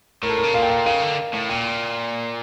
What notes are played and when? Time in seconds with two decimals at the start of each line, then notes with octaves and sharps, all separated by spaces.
0.23 A2 A#4
0.30 A4
0.37 A#4
0.43 C#3
0.54 A#2 F5
0.63 G5
0.69 F5
0.86 C#3 F5
1.02 D3
1.34 A2
1.49 A#2 G5